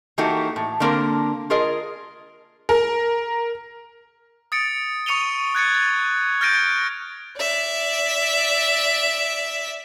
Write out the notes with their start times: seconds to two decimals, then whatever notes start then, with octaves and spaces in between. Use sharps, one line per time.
0.18 E3 A#3 D#4 F#4 G4 A4
0.56 A2
0.80 D3 A#3 C4 A#4
1.50 F4 G#4 A#4 D#5
2.69 A#4
4.52 D#6 A6 C#7 D7
5.06 C#6 D#6 C#7 D#7 F7 G7
5.55 F#6 G#6 A6 C#7
5.75 A6
6.41 F6 G6 A6 A#6 D7 D#7
6.54 D7
7.38 D5 E5